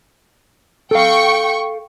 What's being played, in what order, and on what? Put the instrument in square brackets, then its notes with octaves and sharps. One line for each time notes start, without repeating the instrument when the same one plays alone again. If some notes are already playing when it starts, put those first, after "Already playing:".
[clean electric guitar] A4 F5 [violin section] G5 C#6